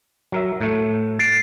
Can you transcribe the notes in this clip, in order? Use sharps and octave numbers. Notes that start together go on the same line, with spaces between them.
F#3 A#4 E5
A2 A3
A6 C7 D7